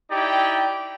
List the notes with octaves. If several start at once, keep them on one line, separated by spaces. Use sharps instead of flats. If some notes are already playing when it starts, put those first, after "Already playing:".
D#4 E4 G4 D5 G5